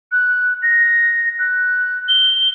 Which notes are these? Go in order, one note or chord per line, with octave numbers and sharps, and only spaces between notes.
F#6
A#6
F#6
G7